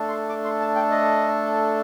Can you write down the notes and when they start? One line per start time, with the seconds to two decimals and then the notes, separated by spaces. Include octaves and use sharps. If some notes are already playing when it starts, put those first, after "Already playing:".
Already playing: A3 D4 A4
0.08 C6
0.29 D6
0.44 C6
0.61 A5
0.76 G5
0.91 D#5